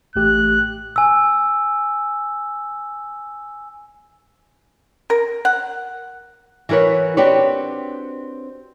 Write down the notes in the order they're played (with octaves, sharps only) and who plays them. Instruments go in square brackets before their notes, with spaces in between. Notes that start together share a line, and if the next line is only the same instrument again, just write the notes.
[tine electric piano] A1 A3 G4 [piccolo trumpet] F#6
[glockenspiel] G#5 E6
[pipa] A#4
F#5
[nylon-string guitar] E3 F#4 A#4 B4 C#5
C4 D4 F#4 G4 B4 C#5